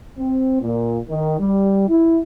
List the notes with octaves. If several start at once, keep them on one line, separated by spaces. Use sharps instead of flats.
C4
A#2
D#3
G3
E4